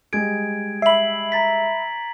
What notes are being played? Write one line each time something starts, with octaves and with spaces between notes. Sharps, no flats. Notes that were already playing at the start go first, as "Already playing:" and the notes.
G3 G#3 G#4 G#6 D7
E5 B5 C7 F#7
A#5 A6 B6